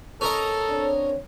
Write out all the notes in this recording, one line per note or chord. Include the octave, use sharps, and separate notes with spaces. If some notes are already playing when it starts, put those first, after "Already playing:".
C#4 A4 A#4 D#5
C4 D4 C#5